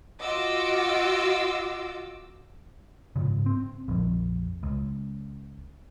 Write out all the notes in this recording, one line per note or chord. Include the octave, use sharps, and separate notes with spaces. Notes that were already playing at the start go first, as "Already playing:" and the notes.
F4 F#4 D#5 D6 E6
G#2 C#3
C4
A#1 F2
C#2